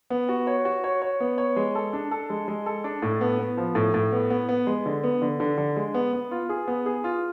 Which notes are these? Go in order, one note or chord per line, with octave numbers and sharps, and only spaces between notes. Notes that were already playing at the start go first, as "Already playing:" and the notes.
B3
F#4
C#5
F#4
C#5
C#5
B3
C#5
G#3
A4
D4
A4
G#3
G#3
A4
D4
A2
B3
B3
F3
A2
A2
B3
B3
B3
G#3
D3
B3
D3
D3
D3
G#3
B3
B3
F4
G#4
B3
G#4
F4